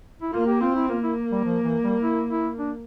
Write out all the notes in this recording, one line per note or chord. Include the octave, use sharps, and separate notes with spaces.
E4
A#3 F4
G4
C4 F4
E4
A#3 F4
E4
G3
F3
E3
G3
E4
E4
D4